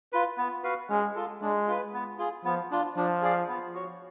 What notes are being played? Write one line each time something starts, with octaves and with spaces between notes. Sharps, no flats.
F4 B4
B3
F#4 B4 F5
G#3 C#4
F4 A4
G#3 D4
F4 B4
B3
F4 G#4
F3 B3
D4 F4
F3 D4
G#4 D5 F5
B3
F#4 C#5